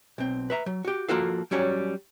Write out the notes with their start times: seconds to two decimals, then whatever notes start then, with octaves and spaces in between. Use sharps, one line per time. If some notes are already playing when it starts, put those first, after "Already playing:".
0.18 B1 C4
0.50 B4 E5 A#5
0.66 F#3
0.85 F#4 G4
1.09 F3 A#3 F4 F#4 A4 F5
1.51 F#3 G3 C#4 F#4 C#5